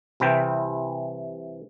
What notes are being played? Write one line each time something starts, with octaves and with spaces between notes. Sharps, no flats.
C2 C3 E3 G5